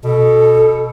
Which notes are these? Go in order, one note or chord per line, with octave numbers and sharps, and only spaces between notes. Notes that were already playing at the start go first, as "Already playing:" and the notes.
B2 A4